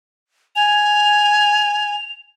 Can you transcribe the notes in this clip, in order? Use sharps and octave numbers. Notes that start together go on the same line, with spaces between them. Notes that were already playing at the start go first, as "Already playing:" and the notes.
G#5 F7